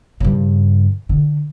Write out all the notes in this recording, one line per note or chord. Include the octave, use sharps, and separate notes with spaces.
G2 C#3
D3